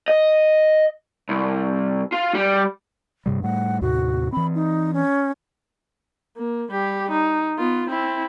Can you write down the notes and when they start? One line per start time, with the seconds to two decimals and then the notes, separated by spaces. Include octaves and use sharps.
0.08 D#5
1.29 C2
2.12 F4
2.35 G3
3.26 G2 C3 G3
3.43 A2 G3 A3 F#5
3.81 D#2 A2 C3 F#4
4.32 E3 C4 B5
4.55 D#4
4.94 C#4
6.37 A#3
6.71 G3 G4
7.11 D#4
7.58 B3 F4
7.89 C4 E4